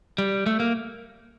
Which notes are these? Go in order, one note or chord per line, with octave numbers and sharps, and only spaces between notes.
G3
A3
A#3